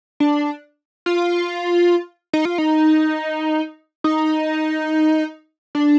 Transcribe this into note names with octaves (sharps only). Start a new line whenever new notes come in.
D4
F4
D#4
F4
D#4
D#4
D4